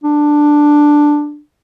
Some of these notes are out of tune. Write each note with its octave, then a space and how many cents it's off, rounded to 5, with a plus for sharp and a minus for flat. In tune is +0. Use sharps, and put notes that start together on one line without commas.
D4 +5